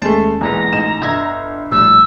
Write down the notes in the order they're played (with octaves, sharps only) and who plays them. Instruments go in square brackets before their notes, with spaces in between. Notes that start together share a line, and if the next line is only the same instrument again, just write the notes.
[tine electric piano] D#2 C#4 A5 [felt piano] G#3 A3
[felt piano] B1 A#2 [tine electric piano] E3 G#3 B3 [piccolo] A#5
[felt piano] A1 D#4 E7
[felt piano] G1 [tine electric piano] D#5 E5 G#6
[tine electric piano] A#1 A2 G3 [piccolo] E6